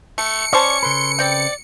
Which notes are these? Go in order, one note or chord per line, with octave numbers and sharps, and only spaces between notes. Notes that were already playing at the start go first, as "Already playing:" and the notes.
A3 C#7
C#4 C5 D5 A5 C#6
C#3 A4 B4 C6
C4 D5 G5